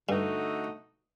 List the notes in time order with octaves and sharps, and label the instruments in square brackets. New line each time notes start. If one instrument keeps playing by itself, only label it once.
[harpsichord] G2 [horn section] D3 A3 D#4 F#4